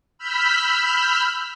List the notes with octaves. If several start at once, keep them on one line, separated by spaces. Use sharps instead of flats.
B5 E6 F6 G6 B6